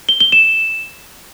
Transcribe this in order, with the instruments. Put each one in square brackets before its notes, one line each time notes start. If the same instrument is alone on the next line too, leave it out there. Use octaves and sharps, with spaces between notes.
[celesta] G7
G7
E7